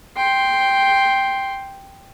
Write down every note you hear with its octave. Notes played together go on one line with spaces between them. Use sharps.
G5 C6